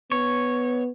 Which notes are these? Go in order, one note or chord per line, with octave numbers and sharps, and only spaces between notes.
B3 C#5